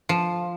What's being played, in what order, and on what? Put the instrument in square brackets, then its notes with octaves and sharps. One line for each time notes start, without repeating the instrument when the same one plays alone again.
[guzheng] F3